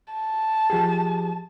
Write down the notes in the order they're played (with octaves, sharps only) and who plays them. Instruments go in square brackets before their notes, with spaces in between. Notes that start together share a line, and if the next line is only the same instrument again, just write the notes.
[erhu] A5
[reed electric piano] F3 G4 G#4